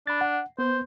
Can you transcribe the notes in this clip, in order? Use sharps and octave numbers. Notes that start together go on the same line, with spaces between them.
D4 B5 A6
F#5
B3 B4 C5 G6